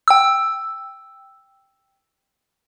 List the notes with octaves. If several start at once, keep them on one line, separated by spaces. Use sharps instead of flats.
G5 E6